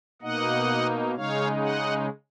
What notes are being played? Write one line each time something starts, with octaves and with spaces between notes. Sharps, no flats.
B2 A#3 D#4 D#5 F#5
C#3 G#3 D#4 C#5 F5
D#5 F#5